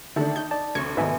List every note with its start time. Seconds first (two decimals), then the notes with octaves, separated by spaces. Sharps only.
0.16 D3 D#3 A3 D4 E5 A5
0.36 D#4 G6
0.51 D5 A5
0.75 F1 D2 C#6 G#6
0.97 G#2 B2 D#3 B4 E5 G#5